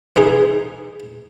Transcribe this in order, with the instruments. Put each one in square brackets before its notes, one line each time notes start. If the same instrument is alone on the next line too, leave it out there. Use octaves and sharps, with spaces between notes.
[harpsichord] E3 D#4 G#4